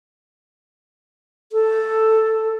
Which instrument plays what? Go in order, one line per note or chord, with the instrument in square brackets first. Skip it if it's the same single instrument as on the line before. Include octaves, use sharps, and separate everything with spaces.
[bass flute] A4